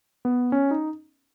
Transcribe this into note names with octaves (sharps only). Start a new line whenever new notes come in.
B3
C#4
D#4